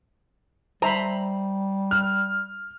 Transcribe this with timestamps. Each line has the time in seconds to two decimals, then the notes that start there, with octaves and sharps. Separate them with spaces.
0.82 G3 C5 E5 A#5 B5
1.91 F6